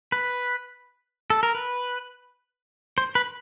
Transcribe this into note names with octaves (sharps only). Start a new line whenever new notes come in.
B4
A4
A#4
B4
C5
B4